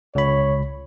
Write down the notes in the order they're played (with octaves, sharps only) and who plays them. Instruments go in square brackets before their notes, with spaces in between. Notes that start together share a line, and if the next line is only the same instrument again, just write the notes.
[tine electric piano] C#2 B5 [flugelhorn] C#5